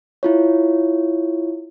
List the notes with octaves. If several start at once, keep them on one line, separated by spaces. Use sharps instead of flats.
E4 F4 C#5